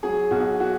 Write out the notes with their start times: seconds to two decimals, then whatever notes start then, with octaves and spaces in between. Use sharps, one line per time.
0.03 F#3 G#4
0.31 B1 F#4
0.60 F#4